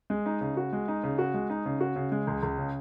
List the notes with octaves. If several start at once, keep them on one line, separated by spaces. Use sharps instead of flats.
G#3
D#4
C#3
F#4
G#3
D#4
C#3
F#4
G#3
D#4
C#3
F#4
C#3
G#3
C#2
C#2
C#3